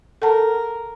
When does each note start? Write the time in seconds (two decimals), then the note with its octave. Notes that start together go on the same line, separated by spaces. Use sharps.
0.22 A4 A#4 F#5 A5